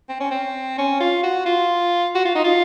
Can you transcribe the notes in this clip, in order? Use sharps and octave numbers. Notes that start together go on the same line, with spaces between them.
C4
C#4
C4
C#4
F4
F#4
F4
F#4
F4
D#4
F4